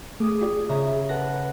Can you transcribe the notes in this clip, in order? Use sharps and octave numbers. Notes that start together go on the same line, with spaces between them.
A3 G#4 D6 D#6
F4 G4 D5
C#3 E5 A#5
A4 B4 F#5 A#6